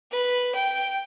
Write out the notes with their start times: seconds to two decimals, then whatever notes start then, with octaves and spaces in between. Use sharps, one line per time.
0.12 B4
0.55 G5